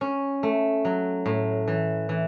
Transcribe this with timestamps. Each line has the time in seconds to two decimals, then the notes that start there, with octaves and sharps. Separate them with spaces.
0.01 C#4
0.43 A3
0.85 F#3
1.26 A2
1.68 E3
2.09 E3